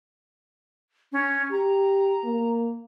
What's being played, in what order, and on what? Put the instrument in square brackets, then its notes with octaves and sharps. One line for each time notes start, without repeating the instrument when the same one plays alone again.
[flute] C#4
[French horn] G4 [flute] A#5
[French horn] A#3